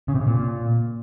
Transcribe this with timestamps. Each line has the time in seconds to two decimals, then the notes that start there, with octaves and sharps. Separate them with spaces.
0.08 C#3
0.15 C3
0.21 C#3
0.27 A#2